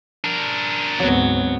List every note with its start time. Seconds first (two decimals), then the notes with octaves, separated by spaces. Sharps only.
0.24 D4 A#4
1.00 D2 G#2 F#3 B3 C4